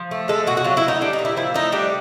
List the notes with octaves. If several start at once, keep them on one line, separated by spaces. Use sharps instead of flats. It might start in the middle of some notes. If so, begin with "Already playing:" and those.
Already playing: F3
A3
G#3 A4
B2 F#4
F#4
F#3 F4
E4
A3 D#4
G3 D4
D#4
A#2
E4
F3 E4
A3 D#4
G3 D4